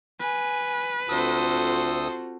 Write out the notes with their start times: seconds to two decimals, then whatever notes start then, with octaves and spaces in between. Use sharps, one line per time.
0.20 B4 G#5
1.09 D2 C4 F4 F#4 A4 C5 D#6 E6